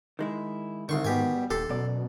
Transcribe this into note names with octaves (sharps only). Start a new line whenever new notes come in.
D#3 G#3 E4
C2 D3 D#3 C6 C#6
G#2 B2 G4 G#5
G3
D#1 G4 A4 C6
F#2 B2 D5